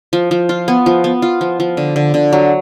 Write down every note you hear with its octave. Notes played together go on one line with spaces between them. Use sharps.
F3
F3
F4
B3
F3
B3
F4
F3
F3
D3
D3
D3
F#3